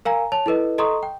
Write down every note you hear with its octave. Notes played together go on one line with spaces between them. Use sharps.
A#4 F5 G#5 A#5
C#5 A5 F7
E4 A4 B4 D#5
A4 D#5 A#5 C6 C#6 D#6
G5